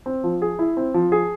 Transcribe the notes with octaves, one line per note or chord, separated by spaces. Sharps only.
C4
F3
G#4
E4
C4
F3
G#4